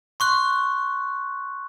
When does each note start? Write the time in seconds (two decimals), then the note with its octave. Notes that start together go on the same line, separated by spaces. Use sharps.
0.20 C6 C#6 F#6